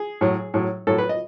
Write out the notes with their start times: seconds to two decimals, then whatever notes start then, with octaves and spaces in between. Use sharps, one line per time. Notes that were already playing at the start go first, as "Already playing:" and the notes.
Already playing: G#4
0.21 A2 F#3
0.54 A2 F#3
0.87 A2 F#3 A4
0.98 B4
1.09 D#5